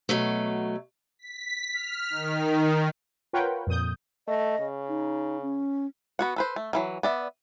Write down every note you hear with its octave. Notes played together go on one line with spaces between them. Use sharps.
B2 F#3 A3
B6
F6
D#3
F4 A#4 B4 C#5 F#5 G5
F2 A#2 D#6 G6
A3 D#5
C#3
D#4
C#4
B3 F#4 F#5
A4 B4 C5
A3
D#3 E3 F#3
B3 D5 E5